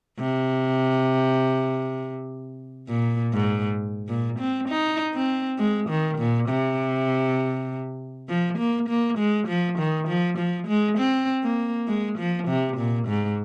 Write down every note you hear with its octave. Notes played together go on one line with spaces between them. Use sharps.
C3
A#2
G#2
A#2
C4
D#4
C4
G#3
D#3
A#2
C3
F3
A#3
A#3
G#3
F3
D#3
F3
F3
G#3
C4
A#3
G#3
F3
C3
A#2
G#2